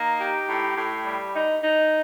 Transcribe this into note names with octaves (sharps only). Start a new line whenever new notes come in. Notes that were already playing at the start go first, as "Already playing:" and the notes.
Already playing: A#3 D#4
G4
A2
A2
G3
D#4
D#4